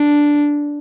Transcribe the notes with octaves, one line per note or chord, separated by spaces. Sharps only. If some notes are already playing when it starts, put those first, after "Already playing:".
Already playing: D4